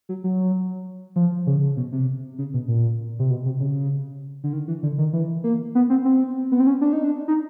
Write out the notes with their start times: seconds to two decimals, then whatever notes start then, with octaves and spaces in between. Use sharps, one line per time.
0.09 F#3
0.24 F#3
1.16 F3
1.47 C#3
1.77 B2
1.92 C3
2.38 C#3
2.54 B2
2.68 A#2
3.19 C3
3.30 B2
3.46 C3
3.60 C#3
4.44 D3
4.53 D#3
4.68 E3
4.83 D3
4.98 D#3
5.13 E3
5.44 A#3
5.75 B3
5.90 C4
6.05 C4
6.52 B3
6.60 C4
6.67 C#4
6.81 D4
6.93 D#4
7.04 D4
7.28 D#4